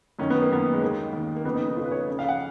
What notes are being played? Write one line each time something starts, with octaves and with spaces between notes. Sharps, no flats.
F#2 D#3 C#4
B3
A#3
F#2 D#3 B3
G#3
D#2 D#3 A#3
D#2 D#3
A#3
F2 C#3 B3
D#4
D#4
F2 C#3 F4
B4
C#5
F2 C#3
F5
F#5